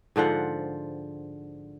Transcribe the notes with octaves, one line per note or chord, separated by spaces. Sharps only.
G#2 D3 F3 F#5